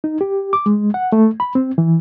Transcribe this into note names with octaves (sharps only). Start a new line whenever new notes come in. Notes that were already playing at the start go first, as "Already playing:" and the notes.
D#4
G4
D6
G#3
F#5
A3
B5
C4
E3